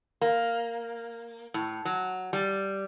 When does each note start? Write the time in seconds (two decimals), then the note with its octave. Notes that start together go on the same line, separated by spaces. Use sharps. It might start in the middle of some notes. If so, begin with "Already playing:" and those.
0.21 A#3
1.54 A2
1.85 F#3
2.33 G3